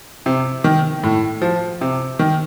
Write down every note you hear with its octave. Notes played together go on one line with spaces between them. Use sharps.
C3
D#3
A2
F3
C3
D#3